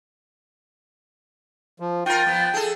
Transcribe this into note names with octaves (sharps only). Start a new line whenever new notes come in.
F3
F4 A#4 G5
F3 B3
G#4 A4